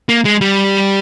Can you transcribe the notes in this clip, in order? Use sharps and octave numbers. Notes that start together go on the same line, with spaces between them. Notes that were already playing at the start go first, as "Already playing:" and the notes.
A#3
G#3
G3